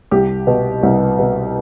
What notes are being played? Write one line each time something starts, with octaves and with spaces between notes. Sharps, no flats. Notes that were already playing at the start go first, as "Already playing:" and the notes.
C2 G4
B2
C2
B2